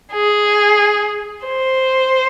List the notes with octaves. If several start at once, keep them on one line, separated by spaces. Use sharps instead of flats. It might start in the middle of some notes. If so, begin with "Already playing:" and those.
G#4
C5